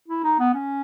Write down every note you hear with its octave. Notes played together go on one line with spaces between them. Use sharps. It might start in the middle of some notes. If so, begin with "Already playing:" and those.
E4
D#4
B3
C#4